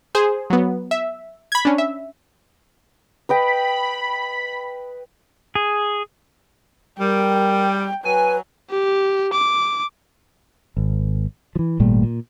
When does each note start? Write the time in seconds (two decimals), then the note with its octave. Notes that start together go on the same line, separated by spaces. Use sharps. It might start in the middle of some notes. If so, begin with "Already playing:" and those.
0.15 G#4 C5
0.50 F#3 B3
0.91 E5
1.52 B5 G#6
1.65 C#4 D4
1.78 E5
3.29 B4 D#5 G5 B5
5.55 G#4
6.99 G3 A#4 G5
8.05 F#3 B4 G#5
8.70 G4
9.33 D6
10.77 G#1
11.56 E3 F3
11.80 G#1 A#2 G3 A3
12.03 A#2